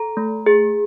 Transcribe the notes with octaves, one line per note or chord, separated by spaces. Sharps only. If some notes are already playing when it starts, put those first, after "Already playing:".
Already playing: A4 A#5
A3
G#4